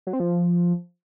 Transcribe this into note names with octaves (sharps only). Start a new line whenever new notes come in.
F#3
C4
F3